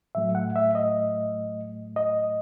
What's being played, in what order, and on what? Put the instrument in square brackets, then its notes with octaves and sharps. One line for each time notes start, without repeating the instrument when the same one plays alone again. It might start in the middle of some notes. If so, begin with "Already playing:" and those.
[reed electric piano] A2 F#3 A3 E5
F#5
E5
D#5
D#5